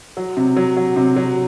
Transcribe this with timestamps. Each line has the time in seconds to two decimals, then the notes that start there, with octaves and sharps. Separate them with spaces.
0.17 F#3
0.37 C3
0.56 F#3
0.76 F#3
0.96 C3
1.16 F#3